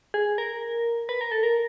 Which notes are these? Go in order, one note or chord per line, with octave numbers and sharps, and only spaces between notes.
G#4
A#4
B4
A#4
A4
A#4